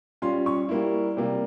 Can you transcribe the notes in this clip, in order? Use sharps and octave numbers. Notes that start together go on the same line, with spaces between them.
G3 C#4 F4 C6
C#6
G3 A#3 E4
C3 G3 A#3